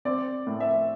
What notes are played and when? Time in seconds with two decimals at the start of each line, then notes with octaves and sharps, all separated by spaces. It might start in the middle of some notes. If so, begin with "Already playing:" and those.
0.05 C4 D5
0.47 A2
0.60 E5